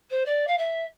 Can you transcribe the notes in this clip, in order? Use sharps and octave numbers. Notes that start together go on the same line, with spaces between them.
C5
D5
F5
E5